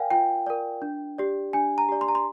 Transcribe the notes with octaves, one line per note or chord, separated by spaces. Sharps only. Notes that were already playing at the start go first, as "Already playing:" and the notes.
Already playing: A#4 D5 F5 G5 G#5
F4 G5
A#4 D5
D4
G4 D5
D4 G#5
A#5
G4 D5
C6
A#5
C6